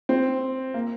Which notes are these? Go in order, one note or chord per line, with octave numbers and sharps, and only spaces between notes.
C4
A#3